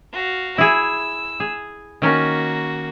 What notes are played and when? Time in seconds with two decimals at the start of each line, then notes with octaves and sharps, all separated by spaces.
0.12 F#4 F5
0.58 E4 G#4 E6
1.40 G#4
2.02 D#3 A#3 C#4 F#4